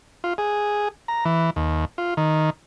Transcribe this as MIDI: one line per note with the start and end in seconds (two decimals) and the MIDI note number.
0.24 0.34 65
0.38 0.88 68
1.08 1.25 82
1.25 1.50 52
1.56 1.85 39
1.98 2.14 65
2.17 2.50 51